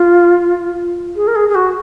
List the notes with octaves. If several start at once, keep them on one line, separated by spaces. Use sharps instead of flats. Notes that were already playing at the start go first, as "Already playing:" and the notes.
Already playing: F4
G#4
A#4
G#4
G#4
F#4